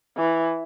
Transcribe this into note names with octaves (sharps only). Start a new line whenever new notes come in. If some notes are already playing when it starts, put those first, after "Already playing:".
E3